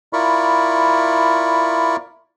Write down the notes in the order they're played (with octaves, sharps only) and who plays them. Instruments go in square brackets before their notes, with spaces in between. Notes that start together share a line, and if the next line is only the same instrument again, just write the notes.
[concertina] E4 F4 A#4 D5 B5 C#6